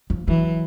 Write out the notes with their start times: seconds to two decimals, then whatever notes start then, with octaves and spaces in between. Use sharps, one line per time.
0.10 F3
0.28 E3 F#3